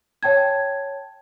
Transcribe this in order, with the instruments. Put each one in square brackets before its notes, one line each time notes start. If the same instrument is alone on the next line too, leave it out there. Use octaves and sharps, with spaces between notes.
[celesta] C#5 G5 A5 G#6